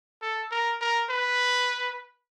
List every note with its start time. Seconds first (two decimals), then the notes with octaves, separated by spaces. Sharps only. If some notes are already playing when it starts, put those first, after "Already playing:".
0.22 A4
0.52 A#4
0.81 A#4
1.10 B4